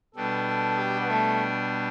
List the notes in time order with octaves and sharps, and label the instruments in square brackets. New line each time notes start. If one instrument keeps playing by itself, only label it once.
[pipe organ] B2 G3 D4 [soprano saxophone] A4
[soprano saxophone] A4
G4
B3
A3